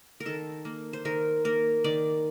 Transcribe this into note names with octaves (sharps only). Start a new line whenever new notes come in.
A#4
D#3 A4
A#3
C5
D#3 A#4
A#3 A#4
D#3 D5